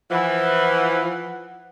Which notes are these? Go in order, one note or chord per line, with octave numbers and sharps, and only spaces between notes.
E3 F3 F#5